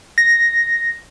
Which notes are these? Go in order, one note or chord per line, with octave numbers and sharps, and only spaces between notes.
A#6